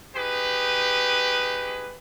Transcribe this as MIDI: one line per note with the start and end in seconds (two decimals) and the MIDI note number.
0.15 1.95 63
0.15 1.95 67
0.15 1.95 68
0.15 1.95 71